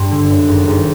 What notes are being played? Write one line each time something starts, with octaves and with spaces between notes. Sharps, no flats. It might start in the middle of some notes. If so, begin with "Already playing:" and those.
Already playing: G2 C6
D3
F#2
G#1
G#1